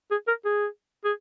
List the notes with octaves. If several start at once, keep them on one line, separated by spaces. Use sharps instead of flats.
G#4
A#4
G#4
G#4